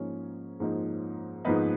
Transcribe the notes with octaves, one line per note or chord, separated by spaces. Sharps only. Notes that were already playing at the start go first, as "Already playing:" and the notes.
Already playing: G#2 F3 A#3 C#4 D#4 C#5
G#2 F3 A#3 D#4
G#2 F3 A#3 B3 D#4 B4